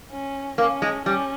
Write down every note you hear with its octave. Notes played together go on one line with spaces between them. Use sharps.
C#4
A#3 C#4
G#3
G3 C#4